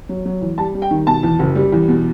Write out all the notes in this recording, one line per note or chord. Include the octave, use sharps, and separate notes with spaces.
F#3
F#3
E2
G3 A5
G3
G5
D#3
B2 A5
E2
F#1
G3
E2
B2